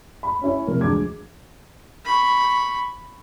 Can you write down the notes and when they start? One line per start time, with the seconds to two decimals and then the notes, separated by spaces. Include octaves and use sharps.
0.23 B5
0.42 C#4 E4 C#5
0.67 F2 C3 A#4
0.81 D2 F3 G#3 D6 G#6
2.05 B5 C#6